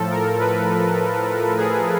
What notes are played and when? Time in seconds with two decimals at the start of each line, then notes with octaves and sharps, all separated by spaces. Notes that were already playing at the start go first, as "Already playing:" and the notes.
Already playing: A2 F3 A4
0.11 A#4
0.40 B4
1.57 G#4